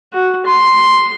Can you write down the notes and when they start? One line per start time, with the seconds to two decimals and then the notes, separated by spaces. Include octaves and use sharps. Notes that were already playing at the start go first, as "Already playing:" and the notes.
0.13 F#4
0.46 C6